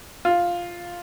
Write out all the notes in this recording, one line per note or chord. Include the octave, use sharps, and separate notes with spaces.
F4